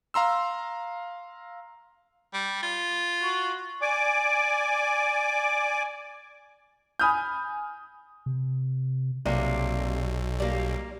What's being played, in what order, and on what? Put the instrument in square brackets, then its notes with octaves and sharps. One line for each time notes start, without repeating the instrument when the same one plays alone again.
[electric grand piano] F5 A#5 C6 E6
[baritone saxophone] G3
F4
[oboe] F#4
[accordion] D5 G#5 D6
[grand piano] G#5 B5 D#6 F6 G6
[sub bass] C3
[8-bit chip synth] B1 [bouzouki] C3 G3 A#3
[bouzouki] G3 A#3